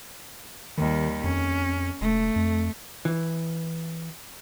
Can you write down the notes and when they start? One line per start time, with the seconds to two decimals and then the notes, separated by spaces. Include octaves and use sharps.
0.77 D#2 D#3 G3
1.24 F2 C#4
2.01 E1 A3
2.36 F2
3.05 E3